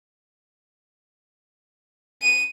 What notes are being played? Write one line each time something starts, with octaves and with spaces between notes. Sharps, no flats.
D#7